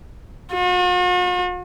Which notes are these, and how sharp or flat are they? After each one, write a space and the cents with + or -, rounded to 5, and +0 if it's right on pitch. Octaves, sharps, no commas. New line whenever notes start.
F#4 -45